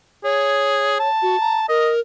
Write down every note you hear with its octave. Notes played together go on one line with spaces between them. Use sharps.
G#4 C#5
A5
F#4
A#5
A#4 D#5